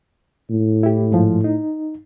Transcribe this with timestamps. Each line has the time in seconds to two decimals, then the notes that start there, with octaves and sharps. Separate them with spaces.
0.50 A2
0.83 E4 G4
1.12 G#2 F3
1.44 D#4